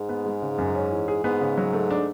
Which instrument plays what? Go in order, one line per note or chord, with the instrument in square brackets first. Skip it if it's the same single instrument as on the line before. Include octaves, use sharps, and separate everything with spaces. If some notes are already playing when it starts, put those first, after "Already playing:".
Already playing: [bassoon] G#2
[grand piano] B3
G#3
C#3
F#2
C#4
E3
G#4
[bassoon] G#2 [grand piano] B3
[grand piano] C#3
F#3
A3
D4